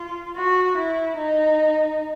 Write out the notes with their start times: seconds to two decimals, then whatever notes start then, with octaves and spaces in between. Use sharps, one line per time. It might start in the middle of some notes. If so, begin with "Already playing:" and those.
Already playing: F4
0.36 F#4
0.77 E4
1.16 D#4